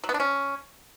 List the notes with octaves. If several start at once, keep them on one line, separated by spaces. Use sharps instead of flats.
F#3
B3
D4
C#4